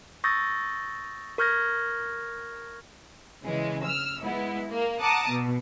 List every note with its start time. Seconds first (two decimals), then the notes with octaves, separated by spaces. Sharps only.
0.24 C#6 D#6 E6 G6 A6 A#6
1.38 A#4 C#6 F6 G6 G#6 A#6
3.45 C#3 E3 G#3
3.84 E6 F6
4.23 G#3 B3 E4
4.70 A#3
5.00 F#5 A5 A#5 D6 D#6
5.29 B2